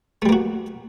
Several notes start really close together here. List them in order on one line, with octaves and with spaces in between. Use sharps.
A3 G3 A#3 F#4